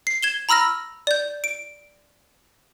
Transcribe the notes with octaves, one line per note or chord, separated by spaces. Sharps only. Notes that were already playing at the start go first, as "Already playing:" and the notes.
C7
G#6 E7 G7
A#5 B5 E6 F6 A#6
D5 G6
D7